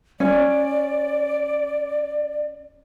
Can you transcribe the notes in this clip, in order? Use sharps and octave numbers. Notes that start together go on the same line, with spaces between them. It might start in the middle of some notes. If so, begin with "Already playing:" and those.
C#4 D5